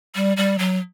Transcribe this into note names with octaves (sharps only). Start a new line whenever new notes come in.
G3
G3
F#3